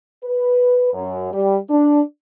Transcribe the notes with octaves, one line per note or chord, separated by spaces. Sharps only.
B4
F#2
G3
D4